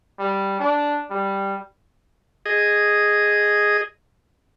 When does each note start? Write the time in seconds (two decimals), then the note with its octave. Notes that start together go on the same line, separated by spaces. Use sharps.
0.19 G3
0.60 D4
1.10 G3
2.46 G#4 D#5